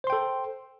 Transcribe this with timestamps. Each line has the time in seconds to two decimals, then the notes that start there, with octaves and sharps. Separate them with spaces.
0.04 C5
0.07 C6
0.10 G5
0.13 A4